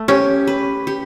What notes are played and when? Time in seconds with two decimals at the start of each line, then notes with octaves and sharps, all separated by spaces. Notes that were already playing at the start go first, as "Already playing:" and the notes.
Already playing: A3
0.08 C#4 G4
0.47 B4
0.87 G4